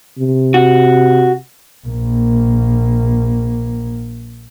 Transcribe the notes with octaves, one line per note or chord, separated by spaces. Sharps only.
C3
F#4
A#1 A#3